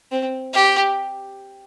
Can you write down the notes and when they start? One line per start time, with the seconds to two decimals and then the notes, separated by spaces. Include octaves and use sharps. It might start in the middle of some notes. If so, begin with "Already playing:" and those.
0.11 C4
0.54 G4